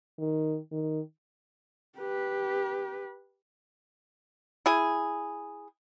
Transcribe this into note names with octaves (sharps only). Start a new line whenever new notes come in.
D#3
D#3
G4 B4
E4 G#4